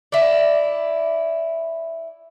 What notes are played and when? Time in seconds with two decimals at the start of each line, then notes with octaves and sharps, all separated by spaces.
0.12 E4 D5